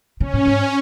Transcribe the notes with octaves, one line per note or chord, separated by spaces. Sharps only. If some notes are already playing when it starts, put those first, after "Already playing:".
C#3 C#4
A2
G#2